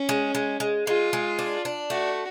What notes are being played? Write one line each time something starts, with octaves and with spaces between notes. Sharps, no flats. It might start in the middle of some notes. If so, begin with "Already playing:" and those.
Already playing: C#4
G#3
G#3
G#3
G#3 F4
G#3
D4
D4
A3 F#4